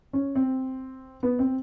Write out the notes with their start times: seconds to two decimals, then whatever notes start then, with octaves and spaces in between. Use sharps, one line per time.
0.13 C#4
0.35 C4
1.23 B3
1.39 C4